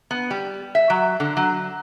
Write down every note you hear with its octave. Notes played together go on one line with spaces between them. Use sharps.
B3
G3
E5
F#3
D3
F#3